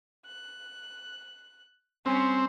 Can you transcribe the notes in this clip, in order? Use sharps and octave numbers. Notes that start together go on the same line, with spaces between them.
F#6
G3 C4 C#4